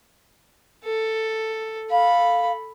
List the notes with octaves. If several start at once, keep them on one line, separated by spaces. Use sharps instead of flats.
A4
A4 F5 B5